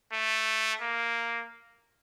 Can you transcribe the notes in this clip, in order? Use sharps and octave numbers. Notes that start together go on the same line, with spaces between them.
A3
A#3